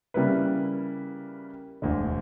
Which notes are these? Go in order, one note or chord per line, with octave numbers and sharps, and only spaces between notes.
C#3 G3 A#3 E4 B4
E1 D2 D3